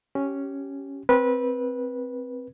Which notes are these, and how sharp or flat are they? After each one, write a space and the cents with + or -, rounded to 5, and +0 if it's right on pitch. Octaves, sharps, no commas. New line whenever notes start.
C#4 +0 G4 -15
C4 +0 B4 -20